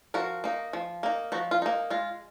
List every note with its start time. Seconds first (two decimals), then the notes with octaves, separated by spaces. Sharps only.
0.14 F3 F#4 A#4
0.44 A#3 D#4
0.73 F3
1.03 A#3 D#4
1.32 F3 D#4 F#4
1.51 F4
1.62 A#3 D#4
1.90 G#3 F4